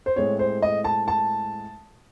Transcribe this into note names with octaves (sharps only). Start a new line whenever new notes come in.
C5
A2 G#3 C4 C#5
C5
D#5
A5
A5